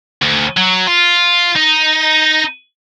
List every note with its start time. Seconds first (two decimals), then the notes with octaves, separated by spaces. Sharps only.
0.22 D2
0.57 F#3
0.87 F4
1.56 D#4